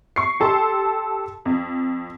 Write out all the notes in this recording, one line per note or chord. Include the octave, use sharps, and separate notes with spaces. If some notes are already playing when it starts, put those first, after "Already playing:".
C#6 C7
G4 A4 A5 C6
F2